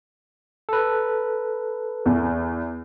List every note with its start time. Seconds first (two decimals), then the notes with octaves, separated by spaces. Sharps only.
0.69 A4 B4
2.06 E2